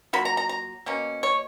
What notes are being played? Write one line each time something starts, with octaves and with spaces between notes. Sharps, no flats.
F#3 A#3 F4 B5
A#5
A#5
A#5
B2 A#3 C#4
C#5